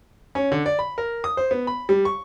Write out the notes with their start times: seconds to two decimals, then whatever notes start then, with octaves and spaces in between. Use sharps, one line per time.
0.35 C#4
0.52 D3
0.66 D5
0.79 B5
0.98 A#4
1.24 D#6
1.37 C5
1.51 B3
1.67 B5
1.89 G3
2.05 C#6